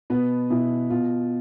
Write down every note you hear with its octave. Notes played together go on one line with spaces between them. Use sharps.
B2 B3 B4
B2 E4
B2 F4